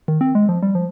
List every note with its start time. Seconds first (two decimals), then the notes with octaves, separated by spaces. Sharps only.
0.08 D#3
0.21 C4
0.35 G#3
0.49 F3
0.62 G3
0.75 F3